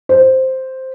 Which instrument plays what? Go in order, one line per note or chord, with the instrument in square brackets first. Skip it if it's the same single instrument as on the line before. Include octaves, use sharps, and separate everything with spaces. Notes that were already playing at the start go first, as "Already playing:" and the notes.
[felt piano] C5